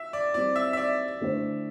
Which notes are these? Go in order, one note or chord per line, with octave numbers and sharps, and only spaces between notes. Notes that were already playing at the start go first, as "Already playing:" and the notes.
Already playing: E5
D5
G3 C4 E4 D5
E5
E5
D5
D3 A3 E4 C5